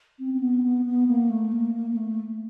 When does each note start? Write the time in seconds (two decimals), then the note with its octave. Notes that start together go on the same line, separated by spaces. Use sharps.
0.19 C4
0.34 C4
0.40 B3
0.59 C4
0.63 B3
0.86 B3
1.07 A#3
1.30 A3
1.52 A#3
1.75 A#3
1.90 A#3
1.97 A3